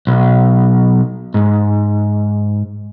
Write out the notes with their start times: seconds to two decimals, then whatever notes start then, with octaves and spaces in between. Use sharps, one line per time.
0.07 B1
1.34 G#2